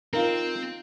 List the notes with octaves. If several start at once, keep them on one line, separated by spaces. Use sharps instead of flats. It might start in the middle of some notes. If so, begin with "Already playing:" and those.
C4 D#4 F4 A#4